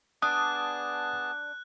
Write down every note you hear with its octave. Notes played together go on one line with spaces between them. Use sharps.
B3 D4 G#4 A5 D#6 F#6